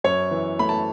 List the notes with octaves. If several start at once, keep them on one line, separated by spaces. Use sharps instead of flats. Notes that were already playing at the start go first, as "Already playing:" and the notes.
F#2 C#5
E3
A3 B5
A5